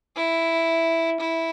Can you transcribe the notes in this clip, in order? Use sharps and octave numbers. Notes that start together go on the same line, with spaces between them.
E4
E4